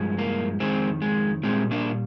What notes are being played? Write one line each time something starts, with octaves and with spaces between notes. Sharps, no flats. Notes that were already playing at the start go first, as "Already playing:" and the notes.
Already playing: G2 F3 G#3
A#3
F2 D#3 G#3 C4
G#3
A#2 G3 G#3 C4
A#3 D4